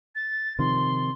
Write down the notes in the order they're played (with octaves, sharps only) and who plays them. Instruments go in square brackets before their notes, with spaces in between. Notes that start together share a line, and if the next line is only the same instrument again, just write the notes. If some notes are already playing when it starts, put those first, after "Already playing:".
[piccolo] A6
[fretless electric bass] C3 D#3 F3 [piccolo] C6